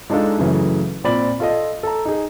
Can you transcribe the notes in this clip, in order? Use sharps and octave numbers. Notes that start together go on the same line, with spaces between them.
G#3 D4 D#4 F4 A4
F#2 C#3 E3 A3
A#2 C4 D5 B5 F#7
F4 A4 D#5
A4 A#5
D#4 G#4